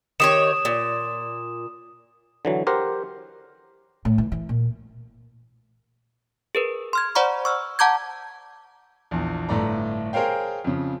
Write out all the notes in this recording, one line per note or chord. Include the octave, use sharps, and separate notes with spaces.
D#3 G4 C#5 D#6 E7
A#2
D3 E3 F#3
G4 A#4 C5 F#5
A2
E3
E3
A#2
G#4 A#4 B4
C6 F6 G#6
C5 D5 F#5 A#5 B5 C#6
C#6 E6 F6
F#5 A5 A#5 D6 G6 G#6
A#1 E2
G1 A2 A3 D5 A#5
G#4 A#4 C5 C#5 F5 G5
F2 C#3